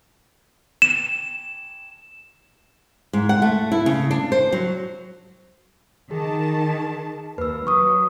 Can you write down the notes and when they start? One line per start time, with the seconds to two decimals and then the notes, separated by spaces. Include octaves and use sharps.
0.82 E7
3.13 G#2
3.29 F#5
3.42 A3
3.72 E4
3.86 C#3
4.11 D4
4.32 C5
4.52 F#3
6.11 D#3 G#4 A5
7.38 D#2 B4 E6
7.67 F#3 C#6 D#6